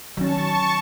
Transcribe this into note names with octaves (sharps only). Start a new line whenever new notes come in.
D#3 F#3 C#4 A5 C#6